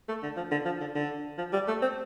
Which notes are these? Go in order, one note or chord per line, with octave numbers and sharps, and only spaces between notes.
A3
D3
F3
D3
F3
D3
D3
F3
G3
A3
C4